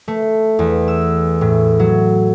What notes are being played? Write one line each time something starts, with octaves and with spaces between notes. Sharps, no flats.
A3
E2
E6
A2
F#3